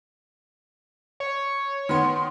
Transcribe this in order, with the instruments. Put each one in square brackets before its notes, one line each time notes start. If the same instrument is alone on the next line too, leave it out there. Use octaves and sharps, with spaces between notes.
[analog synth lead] C#5
[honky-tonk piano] D#3 B3 [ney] C6